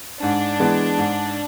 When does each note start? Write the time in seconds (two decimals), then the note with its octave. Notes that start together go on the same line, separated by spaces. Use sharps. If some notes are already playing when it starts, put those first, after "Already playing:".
0.22 G#2 D4
0.60 E3 G#3 B3
0.97 G#2